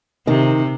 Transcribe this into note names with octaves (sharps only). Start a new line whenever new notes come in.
C3 D#3